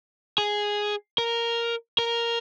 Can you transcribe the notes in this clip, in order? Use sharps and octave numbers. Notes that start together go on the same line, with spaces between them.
G#4
A#4
A#4